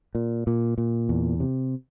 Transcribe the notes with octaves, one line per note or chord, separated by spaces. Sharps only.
A#2
A#2
A#2
E2
C3